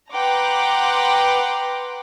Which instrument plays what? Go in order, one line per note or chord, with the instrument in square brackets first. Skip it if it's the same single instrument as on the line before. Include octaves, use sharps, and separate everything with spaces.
[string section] B4 F#5 G5 A#5 C6 D6